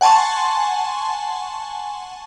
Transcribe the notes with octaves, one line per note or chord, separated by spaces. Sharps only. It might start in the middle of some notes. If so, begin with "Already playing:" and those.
F#5 G#5 A5 C6 C#6